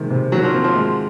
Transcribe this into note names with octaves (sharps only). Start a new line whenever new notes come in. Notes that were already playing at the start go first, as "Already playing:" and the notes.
Already playing: C3 D#3 G#3
C3
D#3 F#3
F3
C4
F3
G#3